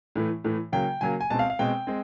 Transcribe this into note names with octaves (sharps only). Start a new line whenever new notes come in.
A2 E3 A3
A2 E3 A3
C#3 F#3 A#3 G5
C#3 F#3 A#3 G#5
G#5
B2 G#3 C4 A5
F5
F5
B2 G#3 C4 G5
G#3 C4